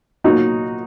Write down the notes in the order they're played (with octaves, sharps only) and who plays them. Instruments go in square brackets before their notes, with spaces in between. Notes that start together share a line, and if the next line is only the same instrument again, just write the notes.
[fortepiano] A#2 F#3 A#3 D#4 F#4